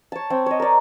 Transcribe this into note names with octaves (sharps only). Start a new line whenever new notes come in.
C#5 A5
C4 C#5 G5
C#5 D#5
A#4 D5